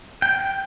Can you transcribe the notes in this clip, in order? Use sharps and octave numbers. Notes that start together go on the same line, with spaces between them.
G5